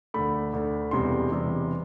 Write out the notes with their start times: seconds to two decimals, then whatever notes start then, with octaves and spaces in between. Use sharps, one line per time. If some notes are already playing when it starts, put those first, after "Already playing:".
0.14 D2 D3 A3 B5
0.53 D2 D3 A3
0.91 E1 E2 C3 G3 C6
1.30 E1 E2 C3 G3